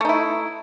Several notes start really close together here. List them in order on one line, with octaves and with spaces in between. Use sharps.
A3 D#4 E4